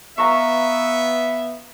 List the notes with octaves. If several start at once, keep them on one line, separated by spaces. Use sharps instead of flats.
B3 E5 F5 A#5 C#6